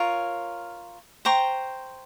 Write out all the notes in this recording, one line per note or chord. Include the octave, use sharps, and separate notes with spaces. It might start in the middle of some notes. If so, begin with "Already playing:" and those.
Already playing: F4 A#4 C#5
C5 G5 A#5 C#6